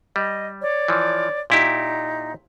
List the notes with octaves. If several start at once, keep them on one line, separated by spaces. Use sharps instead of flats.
G3 D#5
C#5 D5
E3 F3
A#2 D#4 E4 G4